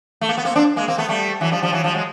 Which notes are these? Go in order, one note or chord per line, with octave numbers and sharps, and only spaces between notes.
A3
A#3
B3
A#3 C4
C4 D4
G#3 A#3
A#3 C4
A3 B3
G3 A3
E3 F#3
F3 G3
F3 G3
E3 F#3
F3 G3
F#3 G#3